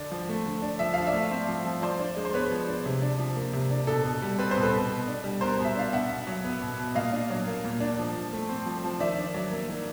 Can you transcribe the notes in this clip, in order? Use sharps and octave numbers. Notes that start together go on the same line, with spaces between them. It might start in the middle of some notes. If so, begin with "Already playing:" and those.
Already playing: D3 D4
F3
A3
D3
D4
F3 E5
F3 F5
D5 E5
A3
C4
F3
F3
F3 C5 D5
D4
G#3
C5
B3 B4 C#5
F3
D4
C3
D4
F3
A#3
C3
D4
B2 A4
B2
G3
C4 B4
C5
B2
A4 B4
B2
B2
D4
G3
B3 A#4 C5
B2
E5
D4 F5
B2 E5 F#5
B2
F#3
B3
B2
B2
A#2 D#5 F5
D4
F#3
A#3
A#2
D4
F3
F3
A3
C4
F3
F3
D#3 D5 E5
D4
F#3
A#3
D#3